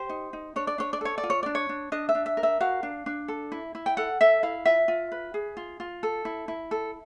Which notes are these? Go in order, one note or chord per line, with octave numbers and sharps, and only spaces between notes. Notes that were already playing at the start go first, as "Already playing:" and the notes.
Already playing: G4 C5
D#4
D#4
D4 C#5
D5
D4 C#5
D5
A4 C#5
D5
F4
C#5
D4 D5
C#5
D4
D4 D#5
E5
D4
E5
A#4
E5
F#4 F5
D4
D4
A4
E4
E4
G5
A4 F#5
A4 E5
E4 F5
F4 E5
F4
B4
G#4
F4
F4
A4
E4
E4
A4